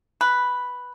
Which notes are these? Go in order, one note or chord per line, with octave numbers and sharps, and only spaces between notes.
B4